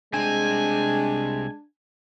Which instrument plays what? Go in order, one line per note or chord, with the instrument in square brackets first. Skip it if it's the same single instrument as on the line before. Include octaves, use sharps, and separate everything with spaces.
[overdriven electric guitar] C2 C4 [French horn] G#3 [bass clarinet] D4 [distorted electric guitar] G#5